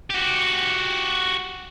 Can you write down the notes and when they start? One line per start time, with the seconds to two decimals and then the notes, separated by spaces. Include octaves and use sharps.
0.10 F#4 G4